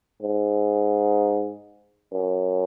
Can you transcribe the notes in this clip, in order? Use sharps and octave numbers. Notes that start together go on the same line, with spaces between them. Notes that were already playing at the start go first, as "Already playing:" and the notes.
G#2
F#2